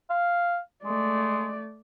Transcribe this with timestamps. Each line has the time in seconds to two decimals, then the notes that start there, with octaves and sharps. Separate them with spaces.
0.10 F5
0.84 G#3 A3 D5